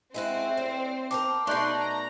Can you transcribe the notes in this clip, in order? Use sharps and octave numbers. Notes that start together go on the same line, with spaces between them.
G#3 C4 E4 F#4 C5
A2 D5
A#4 C5 G5 A5 D6
B2 A3 D#4 D5 C6 C#6 F#6 G6
A#5